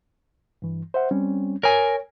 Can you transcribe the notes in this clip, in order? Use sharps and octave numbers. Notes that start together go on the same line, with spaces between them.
G2 E3
C5 E5 F#5
G3 C4 C#4
A#4 C#5 G#5